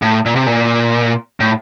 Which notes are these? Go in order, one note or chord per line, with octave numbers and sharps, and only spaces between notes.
A2
A#2
C3
A#2
A2